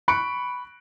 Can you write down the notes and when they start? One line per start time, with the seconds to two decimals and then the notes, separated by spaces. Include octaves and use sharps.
0.08 B5 C#6 F#6 C#7 D7